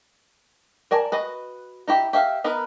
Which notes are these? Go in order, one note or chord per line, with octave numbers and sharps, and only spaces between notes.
A#4 D5 G#5 A5
F#4 B4 D#5
D#4 E4 G4
G4 E5 F5
B3 D#4 A#4 B4